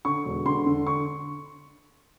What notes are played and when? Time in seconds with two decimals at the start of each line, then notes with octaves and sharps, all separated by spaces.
0.05 D3 C#6
0.25 E1
0.45 D3 C6
0.66 D3
0.87 C#6